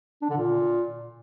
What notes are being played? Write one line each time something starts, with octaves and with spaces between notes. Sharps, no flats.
D4
D3
A#2